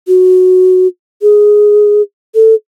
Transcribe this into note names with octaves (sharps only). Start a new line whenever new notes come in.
F#4
G#4
A4